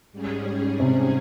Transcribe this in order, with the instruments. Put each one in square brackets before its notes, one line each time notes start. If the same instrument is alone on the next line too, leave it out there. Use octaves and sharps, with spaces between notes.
[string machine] G#2 G3 C#4 G#4
[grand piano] C3